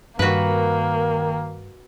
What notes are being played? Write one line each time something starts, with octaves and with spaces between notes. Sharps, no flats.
G2 D#3 A#3 F#4 B4